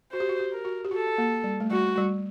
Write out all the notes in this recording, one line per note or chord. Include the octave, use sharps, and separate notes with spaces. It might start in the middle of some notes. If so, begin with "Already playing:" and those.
F#4 C5
G4
F#4
G4
A#4
F#4
G4
F#4 A4
A#3
G3
A3
G3 F#4
G3